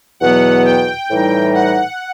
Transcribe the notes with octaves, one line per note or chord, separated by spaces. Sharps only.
E2 B2 F#3 B3 F#5
G5
A2 E3 G3 D#4
F#5